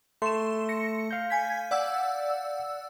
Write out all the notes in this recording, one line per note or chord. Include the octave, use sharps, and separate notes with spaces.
A3 C6 E7
A#6 C#7
F5 G6
G#5 G#6 B6
D5 F#5 E6